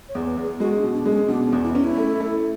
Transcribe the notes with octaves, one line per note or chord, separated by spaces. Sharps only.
C#5
E2
B4
E2
G#4
G#3 F#4
D4
B2
D4
G#3
C#4
B2 D4
C#4
E2
E4
C#4
E4
A3
A3